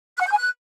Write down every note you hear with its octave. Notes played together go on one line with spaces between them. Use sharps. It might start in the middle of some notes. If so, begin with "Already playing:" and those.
F#6
F#5
G6
G#5
F#6